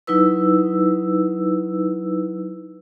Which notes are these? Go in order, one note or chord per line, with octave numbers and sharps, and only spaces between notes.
F#3 D#4 E4 B4 E6